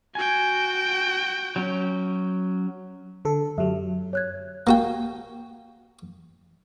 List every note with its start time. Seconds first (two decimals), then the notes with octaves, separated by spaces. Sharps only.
0.15 F#4 G5 G#5
1.56 F#3 C#4
3.25 D3 A4
3.58 F#2 F#3 G4 E5
4.13 C#5 F#6 G#6
4.67 A#3 F#4 G5